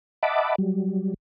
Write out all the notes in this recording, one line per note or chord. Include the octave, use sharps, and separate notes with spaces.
D#5 E5 F#5 A5 B5 D6
F#3 G3